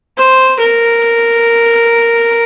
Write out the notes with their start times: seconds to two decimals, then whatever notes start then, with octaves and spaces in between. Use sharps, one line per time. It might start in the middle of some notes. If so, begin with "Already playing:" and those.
0.17 C5
0.59 A#4